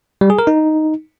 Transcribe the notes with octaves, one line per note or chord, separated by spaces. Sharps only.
G3
G#4
A#4
D#4